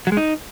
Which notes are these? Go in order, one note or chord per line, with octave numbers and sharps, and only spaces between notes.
F#3
G#3
D#4